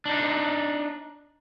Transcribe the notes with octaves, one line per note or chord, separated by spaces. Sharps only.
D4 D#4